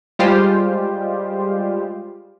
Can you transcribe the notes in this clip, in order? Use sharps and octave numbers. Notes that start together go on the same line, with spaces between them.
G3 G#3 F4 G4 C5